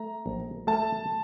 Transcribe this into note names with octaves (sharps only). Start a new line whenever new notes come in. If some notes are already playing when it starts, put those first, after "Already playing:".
Already playing: A3 A#5
A#1
A3 A5